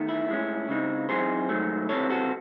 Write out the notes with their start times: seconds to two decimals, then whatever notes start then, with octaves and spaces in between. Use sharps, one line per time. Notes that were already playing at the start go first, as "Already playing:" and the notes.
Already playing: E2 D#3 A3
0.08 E4
0.28 A2 G#3 C#4
0.68 C#2 C#3 G#3 C4 D#4
1.09 F#2 E3 C4 D#4 G#4 C5
1.49 G#2 D#3 F#3 A3
1.89 C#2 C3 E3 C4 A4 C#5
2.10 F#4 A4